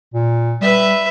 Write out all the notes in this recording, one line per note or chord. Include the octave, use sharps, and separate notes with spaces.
A#2
G3 B4 E5